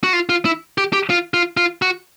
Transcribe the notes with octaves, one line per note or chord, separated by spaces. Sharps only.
F#4
F4
F4
E4
G4
G4
F4
F4
F4
F#4